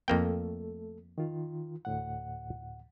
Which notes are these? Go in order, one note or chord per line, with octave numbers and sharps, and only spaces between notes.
F2 A3 A#3 A4 G5
D#3 F4
D2 A2 F#5